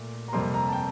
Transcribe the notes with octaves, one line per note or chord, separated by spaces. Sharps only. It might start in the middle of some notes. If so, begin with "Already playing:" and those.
Already playing: A#2 A3
A#5
F2 C3 G3 A#3 C6
A#5
A5
G5